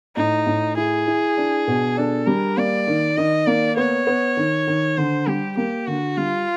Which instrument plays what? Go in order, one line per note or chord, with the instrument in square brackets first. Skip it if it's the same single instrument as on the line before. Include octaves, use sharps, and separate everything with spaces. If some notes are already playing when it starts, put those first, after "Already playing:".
[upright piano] A2 [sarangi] D#4
[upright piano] A2
[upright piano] E4 [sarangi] G#4
[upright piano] E4
D4
B2
[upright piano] D4 [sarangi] A4
[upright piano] G3 [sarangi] A#4
[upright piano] A#3 [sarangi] D5
[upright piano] D#3
[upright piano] D#3 [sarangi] D#5
[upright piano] A#3 [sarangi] D5
[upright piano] B3 [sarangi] C#5
[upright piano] B3
D#3
D#3
[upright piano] D3 [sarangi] C5
[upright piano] G3 [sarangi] G4
[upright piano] A#3 [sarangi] G4
[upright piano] D3 [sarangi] F#4
[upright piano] G3 [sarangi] F4